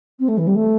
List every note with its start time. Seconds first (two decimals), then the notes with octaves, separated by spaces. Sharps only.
0.19 C4
0.28 A3
0.37 E3
0.46 G3
0.55 A3